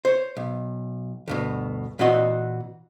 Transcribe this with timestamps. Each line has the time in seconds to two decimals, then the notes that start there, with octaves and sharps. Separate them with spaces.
0.05 C5 C#5
0.37 B1
1.28 D2 G2 B2
1.99 A#2 E3 C4 F#4 D#5 F#5